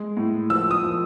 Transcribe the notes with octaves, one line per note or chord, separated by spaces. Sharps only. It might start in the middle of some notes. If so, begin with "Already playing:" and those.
Already playing: G#3
A2
F3 E6
D#6
F3